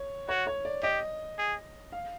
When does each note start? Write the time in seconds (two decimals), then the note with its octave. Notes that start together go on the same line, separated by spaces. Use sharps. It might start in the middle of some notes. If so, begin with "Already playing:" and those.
Already playing: C#5
0.29 F#4 C#5
0.47 C#5
0.65 D5
0.83 G4 D#5
1.38 G#4
1.92 F5